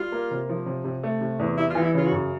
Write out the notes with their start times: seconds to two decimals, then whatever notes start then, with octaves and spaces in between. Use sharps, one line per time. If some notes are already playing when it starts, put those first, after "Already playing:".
Already playing: G3 F4
0.12 A#3
0.31 C3
0.49 F3
0.66 C3
0.84 C3
1.03 A3
1.21 C3
1.39 E2
1.58 G3 E4
1.70 E3 F4
1.82 E4
1.94 C#3 F4
2.06 F#4
2.12 F#2